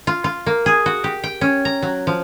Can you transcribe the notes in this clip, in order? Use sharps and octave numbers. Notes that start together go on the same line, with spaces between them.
F4
F4
A#3
G#4
F#4
G4
G5
C#4
A#5
F#3
F3